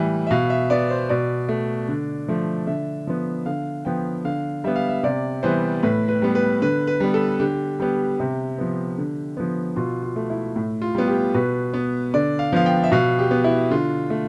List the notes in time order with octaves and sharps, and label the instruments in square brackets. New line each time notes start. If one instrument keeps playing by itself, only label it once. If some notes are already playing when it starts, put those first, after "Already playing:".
Already playing: [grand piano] A2 E3 G3
E5
B2 F5
E5
B3 D5
C5
B2 D5
A3
D3
F3 A3
D3 E5
F3 B3
D3 F5
F3 B3 G5
D3 F5
G3 B3 E5
F5
E5
C3 D5
E3 G3 B3 C5
A2 B4
B4
G3 B3
B4
D3 B4
B4
G3 B3
A4
D3 G4
G3 B3 G4
C3
F3 B3
D3
F3 B3
B2 F4
F4
A3
E4
A2
F4
G3 B3
G4
B2 B4
B3
D3 D5
F5
F3 B3 F5
G5
E5
B2 F5
G4
B3
E4
D3 F4
A3